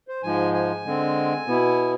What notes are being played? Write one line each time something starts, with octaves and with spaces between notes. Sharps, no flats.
C5
G#2 F3 G#3 G#5
G#5
D3 G#3 C4
B2 B3 E4